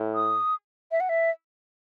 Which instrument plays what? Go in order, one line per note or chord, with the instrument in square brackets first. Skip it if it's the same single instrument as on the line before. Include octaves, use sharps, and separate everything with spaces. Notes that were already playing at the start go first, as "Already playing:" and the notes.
Already playing: [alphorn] A2
[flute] D#6
E5
F#5
E5